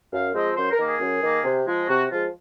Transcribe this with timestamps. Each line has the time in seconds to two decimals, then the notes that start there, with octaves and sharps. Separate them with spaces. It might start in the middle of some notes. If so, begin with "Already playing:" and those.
0.12 F#2 F5
0.34 F3 G#3 C4 D#5
0.56 F#2 C5
0.71 A#4
0.78 D#3 A#3
0.86 G#4
1.00 F#2
1.22 D#3 A#3
1.44 C3
1.66 F3 G#3
1.88 C3 F#4
2.10 F3 G#3 F4